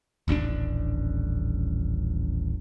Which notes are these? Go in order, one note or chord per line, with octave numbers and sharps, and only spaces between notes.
D#1 A1 C#4 D4